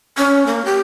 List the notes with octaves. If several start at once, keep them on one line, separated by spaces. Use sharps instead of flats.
C#4
A#3
G4